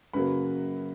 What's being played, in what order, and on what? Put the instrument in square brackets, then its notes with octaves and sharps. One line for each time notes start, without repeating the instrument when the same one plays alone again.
[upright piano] F#2 C#3 F#3 A#3 B4 B5